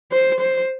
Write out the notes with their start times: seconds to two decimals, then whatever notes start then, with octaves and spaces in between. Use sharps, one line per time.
0.11 C5
0.41 C5